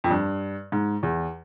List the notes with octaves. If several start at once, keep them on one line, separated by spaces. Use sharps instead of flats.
F2
G2
G#2
E2